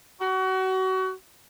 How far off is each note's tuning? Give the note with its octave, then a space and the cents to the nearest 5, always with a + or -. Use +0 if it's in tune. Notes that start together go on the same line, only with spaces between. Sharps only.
F#4 +30